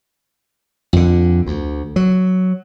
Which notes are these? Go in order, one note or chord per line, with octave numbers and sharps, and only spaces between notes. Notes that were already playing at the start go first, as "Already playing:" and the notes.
F2 D3
D2
F#3